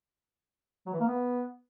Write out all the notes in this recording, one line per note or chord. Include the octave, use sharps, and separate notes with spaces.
F#3
E3
A#3
B3